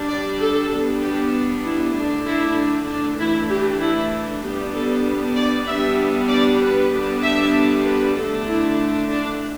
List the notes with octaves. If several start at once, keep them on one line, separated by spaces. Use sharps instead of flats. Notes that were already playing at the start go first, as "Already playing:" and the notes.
Already playing: G3 D4
D5
A4
G3 B3 D4
G4
E4
D3 A3 D4
E4
D4
E3 A3 D4 E4
G4
E4
G3 B3 D4 G4
A4
D5
G3 B3 D4 E5
D5
B4
D3 G3 B3 D4
E5
B4
D3 A3 D4 A4
E4
D4